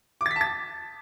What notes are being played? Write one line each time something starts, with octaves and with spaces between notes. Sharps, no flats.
D6
A6
B6
A5
A6